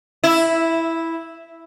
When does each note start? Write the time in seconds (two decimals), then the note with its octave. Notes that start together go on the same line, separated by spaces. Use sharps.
0.24 E4